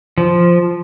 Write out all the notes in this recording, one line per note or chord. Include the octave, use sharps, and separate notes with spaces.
F3